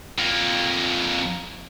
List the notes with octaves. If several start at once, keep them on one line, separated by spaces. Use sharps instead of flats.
F2 A#3